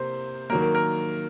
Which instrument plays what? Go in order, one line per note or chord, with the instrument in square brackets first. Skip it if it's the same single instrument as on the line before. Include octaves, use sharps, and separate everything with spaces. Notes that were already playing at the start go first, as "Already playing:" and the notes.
Already playing: [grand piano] C3 A#3 C5
D#3 F#3 A#3 A#4
A#4
A#4